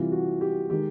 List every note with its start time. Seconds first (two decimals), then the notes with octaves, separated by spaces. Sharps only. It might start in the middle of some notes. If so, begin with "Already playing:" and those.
Already playing: C3 E3 G3 F4
0.12 F#4
0.41 G4
0.70 D#3 G#3 G4